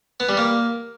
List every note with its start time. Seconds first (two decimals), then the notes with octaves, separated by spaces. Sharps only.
0.20 B3
0.29 G3
0.37 A#3